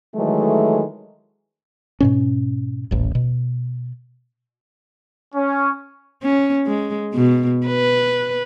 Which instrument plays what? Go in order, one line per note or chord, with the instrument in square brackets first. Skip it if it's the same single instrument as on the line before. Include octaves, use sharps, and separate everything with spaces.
[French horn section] D#3 E3 F#3 G#3 A3
[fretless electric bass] G#2 B2 C#4
D#1 A1
B2
[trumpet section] C#4
[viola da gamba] C#4
G#3
B2
B4